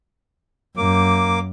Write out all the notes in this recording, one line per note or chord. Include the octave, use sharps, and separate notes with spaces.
F#2 A#3 D6